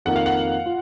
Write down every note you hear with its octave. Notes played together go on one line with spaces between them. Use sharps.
F2 D#3 A#3 F4 F#5
F5
F#5
F4